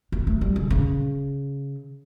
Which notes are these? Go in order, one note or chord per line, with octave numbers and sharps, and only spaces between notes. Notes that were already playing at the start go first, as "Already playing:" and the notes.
A#3
A3
G3
C#3
C#3